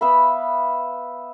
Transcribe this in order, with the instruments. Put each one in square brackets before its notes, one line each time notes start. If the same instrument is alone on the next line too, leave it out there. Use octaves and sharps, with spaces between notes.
[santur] B3 E5 F5 B5